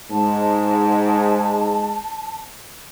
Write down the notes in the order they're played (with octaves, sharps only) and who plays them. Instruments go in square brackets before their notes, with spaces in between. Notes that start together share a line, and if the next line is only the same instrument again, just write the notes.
[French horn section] G#2 G#3 [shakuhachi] A5